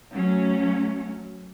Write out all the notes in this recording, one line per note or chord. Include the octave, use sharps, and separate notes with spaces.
F#3 A3 C#4